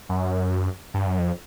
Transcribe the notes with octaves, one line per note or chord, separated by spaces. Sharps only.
F#2
G2
F#2
F2